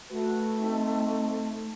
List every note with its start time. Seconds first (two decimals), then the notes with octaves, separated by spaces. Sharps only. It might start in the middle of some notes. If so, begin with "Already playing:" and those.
0.11 A3 F#4 B4
0.61 C4 D#4